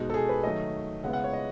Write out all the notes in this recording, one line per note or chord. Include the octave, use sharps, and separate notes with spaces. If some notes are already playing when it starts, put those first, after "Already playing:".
Already playing: B2 G#3 D#4 F#4
A4
G#4
B4
D#3 F#3 A3 D#5
C#3 G#3 B3 E4 F#5
F#5
C#5
D#5